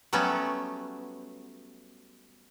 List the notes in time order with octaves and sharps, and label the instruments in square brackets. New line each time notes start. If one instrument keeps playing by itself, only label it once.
[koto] F#3 G3 A3 B3 C#4